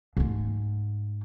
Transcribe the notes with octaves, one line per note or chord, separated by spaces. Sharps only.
G#2 A3